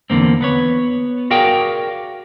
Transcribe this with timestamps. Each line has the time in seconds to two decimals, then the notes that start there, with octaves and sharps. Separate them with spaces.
0.10 E2 G#2 D3 A#3 C4
0.41 B3 B4 C#5
1.31 F#4 G#4 A#4 D5 F5 G5